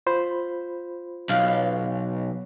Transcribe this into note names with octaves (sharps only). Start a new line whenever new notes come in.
F4 C5 B5
B1 F5